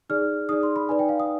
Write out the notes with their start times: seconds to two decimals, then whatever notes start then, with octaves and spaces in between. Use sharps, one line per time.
0.09 D#4 G#4 D5 F6
0.49 D#4 G#4 D5 D#6
0.63 C6
0.76 B5
0.89 D#4 B4 D5 G#5
0.99 G5
1.09 F5
1.20 D#6